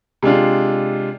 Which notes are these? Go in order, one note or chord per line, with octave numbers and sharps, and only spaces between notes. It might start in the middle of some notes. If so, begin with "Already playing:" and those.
C3 G#3 D4 F4